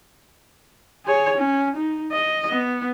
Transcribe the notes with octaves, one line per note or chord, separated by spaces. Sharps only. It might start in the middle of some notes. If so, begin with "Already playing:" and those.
G#4 C#5
C#4
D#4
D#5
B3